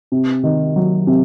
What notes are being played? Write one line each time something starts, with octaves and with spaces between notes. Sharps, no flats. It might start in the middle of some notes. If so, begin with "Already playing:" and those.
C3
D#3
F#3
C3